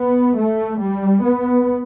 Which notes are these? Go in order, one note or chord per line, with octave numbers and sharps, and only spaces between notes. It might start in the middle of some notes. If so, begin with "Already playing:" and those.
Already playing: B3
A3
G3
B3